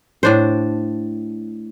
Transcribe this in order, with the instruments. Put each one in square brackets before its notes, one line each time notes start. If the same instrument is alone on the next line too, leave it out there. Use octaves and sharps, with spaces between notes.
[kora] A2 D4 C5